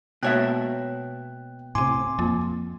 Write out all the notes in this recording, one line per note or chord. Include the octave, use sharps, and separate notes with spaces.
B2 G#3 A#3 C#5 E5 G5 F#6
A2 C3 G#5 C6 D6
F2 A#3 F4